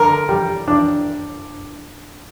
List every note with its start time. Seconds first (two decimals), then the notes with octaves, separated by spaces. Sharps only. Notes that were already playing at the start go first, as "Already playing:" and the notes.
Already playing: D3 A#4
0.29 G3
0.68 D4